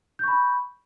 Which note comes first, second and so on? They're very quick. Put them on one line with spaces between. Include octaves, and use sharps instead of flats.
G6 C#6 B5